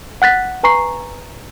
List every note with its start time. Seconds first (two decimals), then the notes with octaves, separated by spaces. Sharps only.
0.22 F#5 F#6 A6 B6
0.63 B4 G#5 A#5 C#6 C7